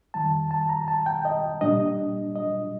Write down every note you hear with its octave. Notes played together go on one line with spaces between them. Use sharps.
F2 D#3 G3 A5
A5
A#5
A5
G5
D#5
A#2 G3 D4 D#5
D#5